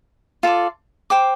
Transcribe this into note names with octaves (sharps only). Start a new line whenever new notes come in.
F4 A4 D5
C5 G5 D6